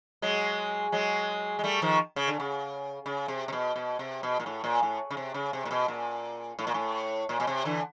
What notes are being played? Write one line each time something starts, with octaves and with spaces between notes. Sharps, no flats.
F#3 G#3
F#3 G#3
G#3
G3 A3
D#3 F3
C#3
D3
C#3
C#3
C3
C3
B2
B2
C3
B2
A#2
A2
A#2
A2
C#3
C3
C#3
C3
A#2
B2
A#2
A2
A#2
A2
A#2
B2
C3
D3 E3